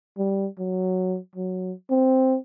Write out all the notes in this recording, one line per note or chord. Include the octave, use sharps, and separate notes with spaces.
G3
F#3
F#3
C4